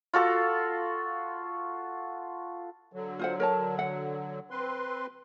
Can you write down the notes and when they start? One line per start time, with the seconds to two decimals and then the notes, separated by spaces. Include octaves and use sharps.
0.14 F4 F#4 A4
2.93 D3 F#3
3.19 F4 C5 F#5
3.40 A#4 C#5 A5
3.79 F#5
4.51 C4 B4 C6